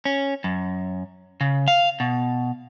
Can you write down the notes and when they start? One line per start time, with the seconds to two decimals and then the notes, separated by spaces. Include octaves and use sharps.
0.05 C#4
0.44 F#2
1.41 C#3
1.68 F5
2.00 B2